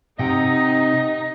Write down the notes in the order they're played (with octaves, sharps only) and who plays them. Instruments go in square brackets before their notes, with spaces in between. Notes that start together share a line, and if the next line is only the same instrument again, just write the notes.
[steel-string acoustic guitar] C3 F#5 G5 [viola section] D#4 [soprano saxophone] D#5